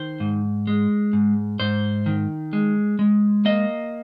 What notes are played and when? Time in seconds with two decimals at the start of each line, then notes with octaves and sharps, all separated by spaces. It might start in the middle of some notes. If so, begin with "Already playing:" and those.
Already playing: D#3 C5
0.20 G#2
0.67 G#3
1.13 G#2
1.60 G#2 C5
2.06 D#3
2.53 G#3
2.99 G#3
3.45 A#3 D#5